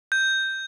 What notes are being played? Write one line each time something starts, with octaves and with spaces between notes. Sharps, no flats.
G6